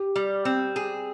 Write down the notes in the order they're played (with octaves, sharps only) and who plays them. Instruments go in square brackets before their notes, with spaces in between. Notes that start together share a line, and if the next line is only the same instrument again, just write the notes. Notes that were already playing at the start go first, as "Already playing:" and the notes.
Already playing: [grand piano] G4
[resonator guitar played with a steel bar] G3
C4
G#4